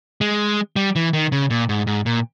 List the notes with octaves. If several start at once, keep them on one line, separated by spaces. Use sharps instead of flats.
G#3
G3
E3
D#3
C#3
A#2
G#2
G#2
A#2